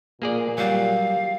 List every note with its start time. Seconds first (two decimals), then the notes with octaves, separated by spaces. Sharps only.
0.22 A#2 A#3 G#4 D5
0.58 F#3 G3 F5
1.01 G4